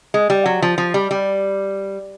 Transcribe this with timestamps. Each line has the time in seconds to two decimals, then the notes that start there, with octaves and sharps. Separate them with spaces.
0.14 G#3
0.30 G3
0.46 F#3
0.62 F3
0.78 F3
0.94 G3
1.11 G3